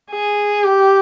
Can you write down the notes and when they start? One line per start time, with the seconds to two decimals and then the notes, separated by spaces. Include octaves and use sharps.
0.11 G#4
0.64 G4